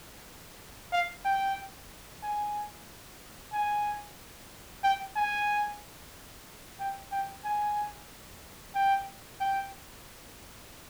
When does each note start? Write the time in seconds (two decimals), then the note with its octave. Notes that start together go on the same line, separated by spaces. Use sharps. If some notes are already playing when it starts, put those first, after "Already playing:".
0.92 F5
1.25 G5
2.23 G#5
3.53 G#5
4.84 G5
5.16 G#5
6.80 G5
7.12 G5
7.45 G#5
8.75 G5
9.40 G5